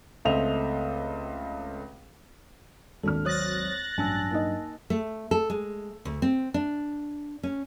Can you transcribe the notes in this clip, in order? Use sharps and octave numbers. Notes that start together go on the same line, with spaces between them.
C#2 A3 C4 D#5 E5 F7
G#1 D#2 D4 A4 F6
F#3 C5 C#5 D#6 F#6 A6 A#6
A1 G2 F#3 D4 G#5 A5 E6
A#3 D#4 D#5
A3
A4
G#3
D2
C4
D4
C#4